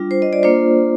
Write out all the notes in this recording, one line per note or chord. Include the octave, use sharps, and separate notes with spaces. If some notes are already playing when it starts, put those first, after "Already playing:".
Already playing: G3 D4 F4
C5
D#5
D5
A#3 D4 F4 C5